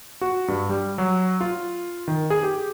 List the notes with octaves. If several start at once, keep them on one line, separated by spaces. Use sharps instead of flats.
F#4
G2
G3
F#3
F4
D#3
G#4
G4